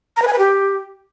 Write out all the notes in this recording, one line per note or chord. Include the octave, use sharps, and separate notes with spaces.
A#5
B4
G#5
B4
G4